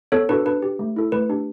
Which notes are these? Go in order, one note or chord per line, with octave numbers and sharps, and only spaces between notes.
B3 A4 C#5
D4 F#4 A4 B4
D4 B4
G4
A3
E4 A4
A3 B4
D4 G4